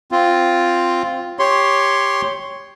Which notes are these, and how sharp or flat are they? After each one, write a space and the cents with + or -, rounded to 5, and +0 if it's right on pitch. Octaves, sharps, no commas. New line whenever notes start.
C4 +0 F4 +0
G4 +10 C#5 +0 C6 +0